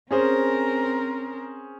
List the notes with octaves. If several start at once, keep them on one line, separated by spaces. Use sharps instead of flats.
C4 C#4 G#4 A#4 C5